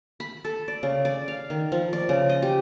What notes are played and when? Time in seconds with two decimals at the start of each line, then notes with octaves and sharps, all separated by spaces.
0.20 B5
0.45 A4
0.68 D5
0.83 C#3
1.05 D5
1.28 F5
1.50 D#3
1.72 F3
1.93 D5
2.09 C#3
2.29 D#5
2.42 G4